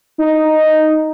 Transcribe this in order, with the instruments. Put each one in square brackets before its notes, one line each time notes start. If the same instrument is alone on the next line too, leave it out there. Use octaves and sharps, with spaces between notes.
[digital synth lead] D#4